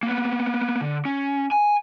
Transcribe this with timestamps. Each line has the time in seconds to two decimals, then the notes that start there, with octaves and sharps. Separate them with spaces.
0.03 A#3 B3
0.81 D3
1.05 C#4
1.52 G#5